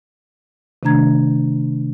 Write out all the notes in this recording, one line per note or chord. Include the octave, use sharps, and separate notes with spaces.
C3 D#3 A3 D4 A#5 G#6